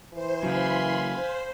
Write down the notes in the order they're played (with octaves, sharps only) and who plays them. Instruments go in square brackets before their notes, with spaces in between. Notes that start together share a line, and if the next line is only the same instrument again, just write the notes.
[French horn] E3 [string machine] C5
[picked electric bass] C#3 F#3 [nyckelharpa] F5 G#5 [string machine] B5 C6
[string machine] C5